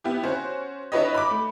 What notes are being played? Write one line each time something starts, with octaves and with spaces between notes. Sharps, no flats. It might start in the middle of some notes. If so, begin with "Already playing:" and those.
B3 E4 G4
C#4 F#4 C5
D4 E4 F#4 B4 C#5 D#5
B5 D6
A3